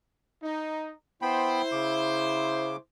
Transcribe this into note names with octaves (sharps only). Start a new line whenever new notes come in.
D#4
B3 E4 C5 G5 B5
C#3 D6